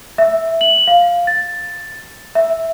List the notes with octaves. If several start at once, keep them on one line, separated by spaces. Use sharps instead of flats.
E5
F#7
F5
A6
E5